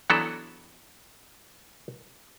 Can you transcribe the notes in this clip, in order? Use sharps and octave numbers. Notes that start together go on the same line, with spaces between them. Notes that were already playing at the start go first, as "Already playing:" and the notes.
E3 F#3 B3 D4 F#4 A4